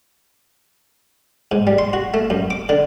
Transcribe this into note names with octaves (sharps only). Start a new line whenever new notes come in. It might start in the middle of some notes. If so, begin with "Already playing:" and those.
G#2
G3
C6
F#4
A3
F#2
D6
D3